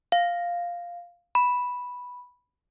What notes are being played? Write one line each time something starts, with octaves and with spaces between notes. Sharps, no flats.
F5
B5